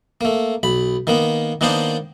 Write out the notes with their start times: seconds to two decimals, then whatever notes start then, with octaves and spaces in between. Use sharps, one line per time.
0.21 A3 A#3
0.63 B1 B5
1.07 D#3 A#3 B3
1.61 D#3 A#3 B3 D4 D#4 C5